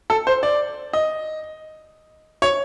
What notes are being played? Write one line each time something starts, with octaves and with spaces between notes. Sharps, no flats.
A4
C5
D5
D#5
C#5